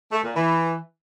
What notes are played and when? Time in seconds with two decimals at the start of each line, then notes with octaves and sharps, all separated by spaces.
0.12 A3
0.24 A#2
0.36 E3